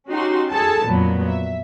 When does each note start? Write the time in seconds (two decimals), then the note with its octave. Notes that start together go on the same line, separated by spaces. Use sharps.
0.11 C#4 D#4 F#4 G4 C6
0.51 G#4 A4 A5
0.84 F2 A#2 F#3 B3
1.27 E5